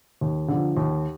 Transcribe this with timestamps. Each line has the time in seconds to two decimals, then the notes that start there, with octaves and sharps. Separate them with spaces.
0.21 D#2
0.48 D3 F3
0.77 D#2